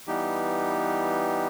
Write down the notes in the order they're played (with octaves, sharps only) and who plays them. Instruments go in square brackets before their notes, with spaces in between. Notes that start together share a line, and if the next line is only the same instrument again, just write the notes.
[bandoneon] E3 G3 B3 D#4 G4